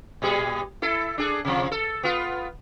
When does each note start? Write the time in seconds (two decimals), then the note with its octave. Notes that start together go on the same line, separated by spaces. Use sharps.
0.22 A#2 G3 G#4
0.82 E4 A4
1.18 D4 G#4 A4
1.45 C3 F3
1.72 A4
2.03 B3 F4